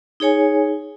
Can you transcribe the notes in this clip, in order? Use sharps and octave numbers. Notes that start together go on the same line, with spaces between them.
D#4 G#4 C#5 G#5